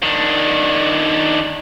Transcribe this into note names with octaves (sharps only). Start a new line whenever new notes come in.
D#3 D4